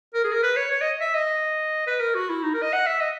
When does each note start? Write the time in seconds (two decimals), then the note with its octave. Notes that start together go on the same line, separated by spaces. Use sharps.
0.14 A#4
0.24 G#4
0.32 A#4
0.43 B4
0.56 C#5
0.71 C#5
0.81 D#5
1.01 E5
1.14 D#5
1.87 B4
2.00 A#4
2.15 F#4
2.29 E4
2.43 D#4
2.54 A#4
2.62 D#5
2.73 F#5
2.86 E5
3.00 D#5